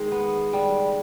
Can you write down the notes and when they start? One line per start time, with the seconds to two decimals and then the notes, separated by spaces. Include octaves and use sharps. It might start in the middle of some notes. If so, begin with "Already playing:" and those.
Already playing: D#3 G#3
0.12 B3
0.53 G3